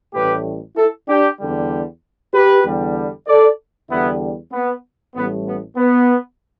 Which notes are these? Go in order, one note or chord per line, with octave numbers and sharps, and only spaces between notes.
A1 A2 G3 G4 B4
E4 A4
D4 G4
E2 D3 G3
G4 B4
E2 D3 G3
A4 D5
E2 D3 G3 B3 E4
B3
A1 A2 G3 B3
B3
B3